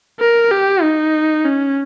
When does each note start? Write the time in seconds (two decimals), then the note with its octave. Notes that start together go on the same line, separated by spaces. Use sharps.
0.20 A#4
0.51 G4
0.82 D#4
1.45 C#4